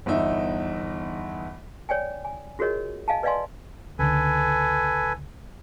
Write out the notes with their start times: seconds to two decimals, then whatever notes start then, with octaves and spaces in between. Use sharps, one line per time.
0.06 G1 E2 D#4 E5
1.89 C#5 D5 G5 G#5
2.25 G#5
2.59 F4 F#4 G#4 A#4 C#5 D#5
3.08 D#5 F5 G#5 A5
3.23 B4 D5 D#5 F5 G#5 C6
3.99 C#2 D3 A4 B4 G#5